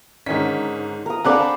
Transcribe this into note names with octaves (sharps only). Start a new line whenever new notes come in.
G#2 D3 D#3 C#4 B6
A#4 D#6
C4 D4 G#4 A4 F5 F#5 B5 F#6